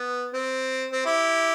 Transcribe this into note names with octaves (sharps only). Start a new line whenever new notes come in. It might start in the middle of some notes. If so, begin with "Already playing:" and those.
Already playing: B3
C4
C4
E4 G4